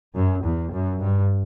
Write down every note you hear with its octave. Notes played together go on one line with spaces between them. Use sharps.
F#2
E2
F#2
G2